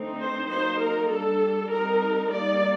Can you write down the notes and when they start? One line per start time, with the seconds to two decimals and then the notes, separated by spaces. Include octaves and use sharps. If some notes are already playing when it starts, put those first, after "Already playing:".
Already playing: D3 A3 C4 D#4
0.18 C5
0.48 F#3 A#3 D#4 C5
0.79 A#4
1.09 G3 D4 A4
1.70 G3 C4 D#4 A#4
2.31 G3 A#3 D#4 D5